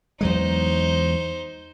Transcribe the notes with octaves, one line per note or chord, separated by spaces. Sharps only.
E2 F#3 G#3 D#4 C5